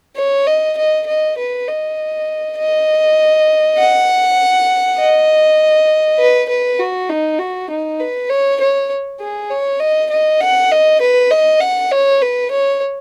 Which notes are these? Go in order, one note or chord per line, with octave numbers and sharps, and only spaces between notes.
C#5
D#5
D#5
D#5
B4
D#5
D#5
F#5
D#5
B4
B4
F#4
D#4
F#4
D#4
B4
C#5
C#5
G#4
C#5
D#5
D#5
F#5
D#5
B4
D#5
F#5
C#5
B4
C#5